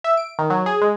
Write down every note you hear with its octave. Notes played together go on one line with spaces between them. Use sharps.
E5
D7
D#3
F#3
G#4
G#3